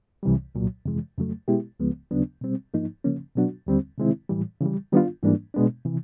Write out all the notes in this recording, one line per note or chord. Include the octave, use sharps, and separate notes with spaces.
C2 C3 E3 G3
C2 A#2 F#3
F2 C3 E3 G#3
F2 C#3 F#3 A3
B2 G#3 B3 E4 G4
C#2 C#3 F3 G#3 B3
D#2 C#3 F#3 B3 D4
B2 G3 C4
G#2 F3 A#3 D#4
C#3 F3 A#3 C#4
B2 F#3 B3 D4 F#4
D#2 D3 G3 C4
C3 D#3 G#3 C4 E4
A2 E3 G3
C#3 E3 G3
D#3 G3 B3 D4 F4
G#2 E3 G3 A#3 D4
B2 G#3 B3 D4
C3 E3